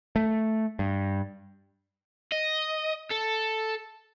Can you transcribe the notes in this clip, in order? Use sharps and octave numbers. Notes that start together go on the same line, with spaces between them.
A3
G2
D#5
A4